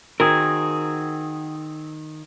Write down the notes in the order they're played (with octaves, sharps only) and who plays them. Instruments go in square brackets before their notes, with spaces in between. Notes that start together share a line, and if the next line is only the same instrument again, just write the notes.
[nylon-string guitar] D#3 [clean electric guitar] C4 G#4 [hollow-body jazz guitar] F#4 A#4